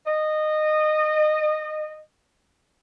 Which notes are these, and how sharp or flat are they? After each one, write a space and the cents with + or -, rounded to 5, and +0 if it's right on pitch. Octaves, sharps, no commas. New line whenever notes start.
D#5 -20